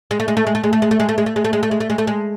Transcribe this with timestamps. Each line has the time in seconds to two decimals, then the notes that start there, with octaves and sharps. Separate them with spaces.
0.11 G#3
0.20 A3
0.28 G#3
0.37 A3
0.47 G#3
0.55 A3
0.64 G#3
0.73 A3
0.82 G#3
0.91 A3
1.00 G#3
1.09 A3
1.18 G#3
1.26 A3
1.36 G#3
1.45 A3
1.53 G#3
1.63 A3
1.71 G#3
1.80 A3
1.90 G#3
1.98 A3
2.07 G#3